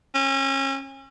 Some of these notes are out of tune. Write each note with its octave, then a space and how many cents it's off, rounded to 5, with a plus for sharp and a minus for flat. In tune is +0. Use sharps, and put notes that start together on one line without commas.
C#4 -30